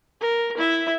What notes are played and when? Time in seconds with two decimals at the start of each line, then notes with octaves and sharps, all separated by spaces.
0.20 A#4
0.57 E4 E5